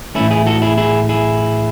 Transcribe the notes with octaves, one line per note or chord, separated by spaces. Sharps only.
A2 E3 A3 C#4 E4
E4 G#4
F#4 A4
E4 G#4
E4 G#4
E4 G#4